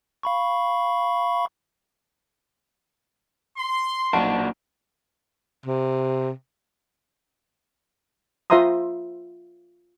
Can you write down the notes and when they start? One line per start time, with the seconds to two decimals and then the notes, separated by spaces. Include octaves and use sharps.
0.23 F5 B5 C#6
3.57 C6
4.13 B1 A#2 D4 F#4 A5 D7
5.66 C3
8.50 F4 C5 E5 A#5 C6 D#6